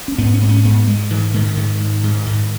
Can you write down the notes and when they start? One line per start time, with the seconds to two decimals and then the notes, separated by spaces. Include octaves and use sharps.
0.08 C#4
0.18 G#2 B3
0.34 C#4
0.41 G#2 B3
0.49 C#4
0.64 G#2 B3
0.87 G#2 G#3
1.10 G#2 E3
1.34 G#2 D#3
1.57 G#2 D#3
1.80 G#2
2.03 G#2
2.26 G#2